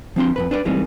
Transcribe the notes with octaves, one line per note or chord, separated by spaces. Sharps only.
F3 C4 D4 C6
F2 B2 B4
D4 B4 C5 D5
F#2 E3 G3 G#3 C4 D#4